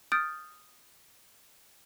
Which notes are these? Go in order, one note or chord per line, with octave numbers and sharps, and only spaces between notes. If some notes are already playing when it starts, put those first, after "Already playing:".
D#6 F6 G6 A6 D7